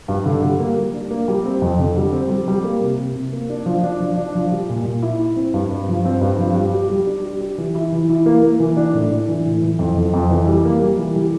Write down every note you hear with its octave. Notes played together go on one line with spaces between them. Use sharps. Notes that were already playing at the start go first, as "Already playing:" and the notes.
G2
D3
G3
A#3
G3
D4
A#3
G3
C4
F2
D3
G3
C4
G3
G3
A#3
C3
C3
C3
A#3
D4
F3
D4
F3
D4
F3
G3
A#2
A#2
E4
E4
C4
G2
G2
F3
C4
G2
F3
G3
G4
G3
D4
G4
G4
E3
E4
E3
E4
A#3
A#3
E3
D4
A2
D4
E3
A2
E3
F2
F2
F2
E3
G3
A#3
G3
E3
G3